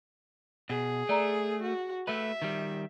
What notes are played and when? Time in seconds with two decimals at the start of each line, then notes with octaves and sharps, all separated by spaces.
0.70 B2 G#4
1.09 A3 D5 A#5
1.63 F#4
2.07 A3 B4 E5
2.42 D#3 G3